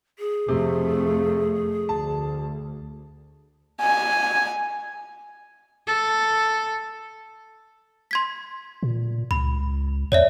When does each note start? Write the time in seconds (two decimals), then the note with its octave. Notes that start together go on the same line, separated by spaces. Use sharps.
0.19 G#4
0.49 F2 C3 A3
1.89 D2 A5
3.81 G#5
5.87 A4
8.11 C6 G#6 B6
8.83 A#2
9.31 C#2 B5
10.12 E2 C#5 D5 E5